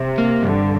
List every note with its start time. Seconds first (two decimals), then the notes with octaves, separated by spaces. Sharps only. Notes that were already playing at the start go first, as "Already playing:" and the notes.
Already playing: C3
0.18 A#3
0.42 G2 D3